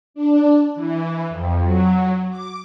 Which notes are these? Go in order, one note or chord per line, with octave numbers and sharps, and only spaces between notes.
D4
E3
F2
F#3
D6